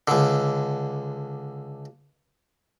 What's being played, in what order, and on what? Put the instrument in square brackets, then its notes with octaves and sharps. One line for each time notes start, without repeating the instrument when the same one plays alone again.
[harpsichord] C#2 D3